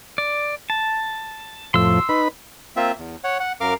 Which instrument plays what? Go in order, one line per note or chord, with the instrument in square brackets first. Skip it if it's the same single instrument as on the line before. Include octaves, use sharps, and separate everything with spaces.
[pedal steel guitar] D5
A5
[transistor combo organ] F2 A2 F3 [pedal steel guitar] C6 E6
[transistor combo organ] D#4 B4 B5
[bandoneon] A#3 C4 F4 E5
E2
C#5 F#5
F#5
F#2 A#4 F5 D6 F6